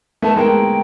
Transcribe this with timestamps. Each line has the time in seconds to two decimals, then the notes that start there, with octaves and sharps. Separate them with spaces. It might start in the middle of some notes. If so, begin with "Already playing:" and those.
0.22 A3 B3 A5
0.36 G#3 A#3 G5